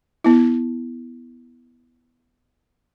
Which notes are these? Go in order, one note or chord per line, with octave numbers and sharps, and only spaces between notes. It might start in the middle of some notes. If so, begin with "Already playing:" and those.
B3 E4